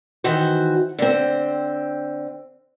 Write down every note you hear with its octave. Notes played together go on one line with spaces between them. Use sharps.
D#3 E3 F#4 C5
D3 C4